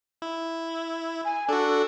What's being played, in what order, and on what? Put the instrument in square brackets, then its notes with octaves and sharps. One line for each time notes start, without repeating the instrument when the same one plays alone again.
[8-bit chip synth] E4
[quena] G#5
[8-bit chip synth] D4 F#4 [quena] A4